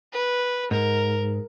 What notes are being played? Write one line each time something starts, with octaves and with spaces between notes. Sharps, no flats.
B4
G#2 A#4